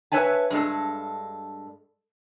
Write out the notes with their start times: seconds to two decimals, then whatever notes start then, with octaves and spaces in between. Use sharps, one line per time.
0.12 B4 C#5 E5 G#5 A5
0.50 G2 G#3 A4